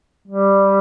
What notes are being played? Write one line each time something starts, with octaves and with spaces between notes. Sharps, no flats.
G3